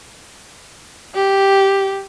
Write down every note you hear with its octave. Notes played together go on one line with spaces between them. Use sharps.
G4